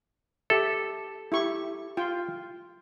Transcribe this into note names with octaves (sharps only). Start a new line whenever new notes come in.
G4 A4 E5
E4 G4 C#6
F4 G5